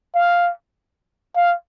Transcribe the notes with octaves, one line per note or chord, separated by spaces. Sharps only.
F5
F5